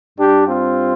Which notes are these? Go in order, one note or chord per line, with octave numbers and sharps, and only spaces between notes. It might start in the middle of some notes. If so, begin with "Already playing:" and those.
G2 G3 D4 G4
C4 F4